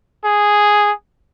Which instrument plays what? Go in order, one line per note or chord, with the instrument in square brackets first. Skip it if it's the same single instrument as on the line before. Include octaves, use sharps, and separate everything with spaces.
[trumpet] G#4